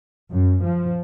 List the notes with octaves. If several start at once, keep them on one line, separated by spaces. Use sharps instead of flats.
F#2
F3